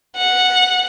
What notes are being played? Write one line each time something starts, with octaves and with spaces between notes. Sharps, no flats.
F#5